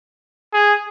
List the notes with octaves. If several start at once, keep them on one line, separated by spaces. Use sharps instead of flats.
G#4